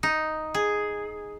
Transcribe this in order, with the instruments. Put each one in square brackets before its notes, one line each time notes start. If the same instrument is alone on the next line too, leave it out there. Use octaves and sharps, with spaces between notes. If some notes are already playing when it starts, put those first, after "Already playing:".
[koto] D#4
G#4